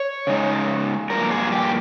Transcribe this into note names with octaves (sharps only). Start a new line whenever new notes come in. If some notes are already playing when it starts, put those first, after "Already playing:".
Already playing: C#5
C#3 G#3 D#4
G2 F3 A#3 A#4
G#4
G4